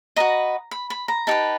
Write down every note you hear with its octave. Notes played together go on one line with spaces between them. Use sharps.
F#4 B4 D#5 A#5
B5
B5
A#5
D#4 G4 B4 A5